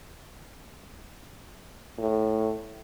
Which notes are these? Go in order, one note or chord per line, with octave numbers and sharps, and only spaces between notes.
A2